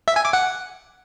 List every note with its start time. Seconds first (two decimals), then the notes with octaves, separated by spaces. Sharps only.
0.08 E5
0.16 G#5
0.25 D6
0.33 F#5